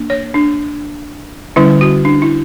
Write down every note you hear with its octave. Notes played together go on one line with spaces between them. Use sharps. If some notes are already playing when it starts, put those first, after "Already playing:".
Already playing: A#3 D4
C#5
D4
D3 G3 C#4 E4
F#4
D4
E4